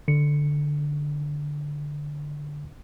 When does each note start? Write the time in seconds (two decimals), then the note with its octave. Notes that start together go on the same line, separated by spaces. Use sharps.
0.08 D3 C#7